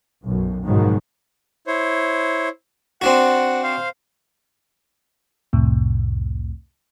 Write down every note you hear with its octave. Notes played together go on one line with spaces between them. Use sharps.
B1 F#2
G#2 B2 D#3 F3 F#3 G#3
E4 C5 C#5
C4 D4 F#4 F#5
C5 F5
C2 F2 A2 C3